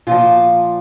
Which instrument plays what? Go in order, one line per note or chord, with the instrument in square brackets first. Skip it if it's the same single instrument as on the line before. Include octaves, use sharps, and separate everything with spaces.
[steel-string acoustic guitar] A#2 F3 F4